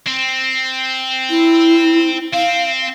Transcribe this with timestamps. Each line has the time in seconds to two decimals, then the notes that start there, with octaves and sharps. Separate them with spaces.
0.07 C4
1.30 E4
2.33 C4 F5